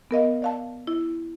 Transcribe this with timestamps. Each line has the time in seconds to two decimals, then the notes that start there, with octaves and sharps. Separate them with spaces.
0.11 B3 A#4 D#5 F5
0.42 D5 F5 A5
0.87 E4